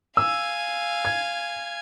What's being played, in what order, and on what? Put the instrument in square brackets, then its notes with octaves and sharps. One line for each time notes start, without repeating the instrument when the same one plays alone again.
[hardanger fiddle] F5 G#5 [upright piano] E6
[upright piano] G#6